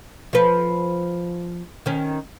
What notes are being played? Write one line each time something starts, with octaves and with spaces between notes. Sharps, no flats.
F3 B4
D#3 C#4